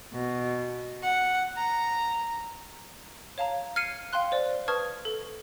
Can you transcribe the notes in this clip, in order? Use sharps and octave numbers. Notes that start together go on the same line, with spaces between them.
B2
F#5
A#5
C#5 F5 A5 A#5
F6 G#6 C7 C#7 D#7
F5 G5 C6 F#6
C5 D5
B4 A5 C#6 D#6 F6 G#6
A4